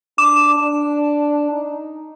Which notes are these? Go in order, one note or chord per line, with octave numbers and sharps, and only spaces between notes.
D4 D6 E7
D4
D#4